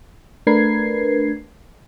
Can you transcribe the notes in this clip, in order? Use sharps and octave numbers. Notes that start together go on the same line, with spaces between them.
A3 D4 A#4 B4 G#6 C7